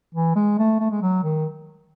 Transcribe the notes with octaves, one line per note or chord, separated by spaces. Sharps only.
E3
G#3
A3
A3
G#3
F#3
D#3